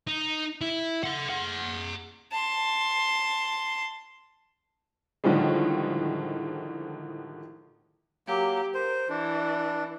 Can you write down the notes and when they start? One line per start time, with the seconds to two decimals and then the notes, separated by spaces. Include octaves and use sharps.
0.07 D#4
0.61 E4
1.04 A4 F#5
1.29 G#4 F#5
2.32 A5 C6
5.24 A2 D3 D#3 F3 G3 G#3
8.28 F#3 A#3 G4
8.74 A#4 C5
9.09 E3 D4